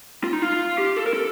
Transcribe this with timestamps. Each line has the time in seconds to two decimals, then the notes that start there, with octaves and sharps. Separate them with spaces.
0.24 F4
0.33 D#4
0.42 F4
0.78 G4
0.97 A4
1.06 A#4
1.13 A4